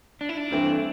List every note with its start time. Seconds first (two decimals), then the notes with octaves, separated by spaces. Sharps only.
0.21 D4
0.29 E4
0.38 D4
0.51 G2 E3 A3 C4 E4